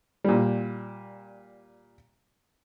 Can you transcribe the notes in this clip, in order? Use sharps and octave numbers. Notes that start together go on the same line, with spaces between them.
A#2 G3